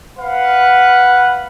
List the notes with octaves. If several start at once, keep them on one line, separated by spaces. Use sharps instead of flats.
B4 F5 F#5